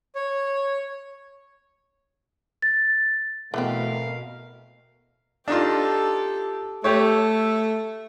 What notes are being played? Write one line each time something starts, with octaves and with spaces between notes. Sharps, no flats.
C#5
A6
B2 E3 A3 B3 C4 A#4 F5
D4 D#4 F4 G4 A4
A3 G4 A4 C#5